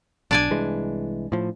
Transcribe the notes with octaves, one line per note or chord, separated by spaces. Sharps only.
B1 D4 D5 G#5
C2 E3 G#3
A2 F3